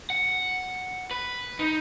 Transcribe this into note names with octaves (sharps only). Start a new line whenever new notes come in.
F#5
B4
D#4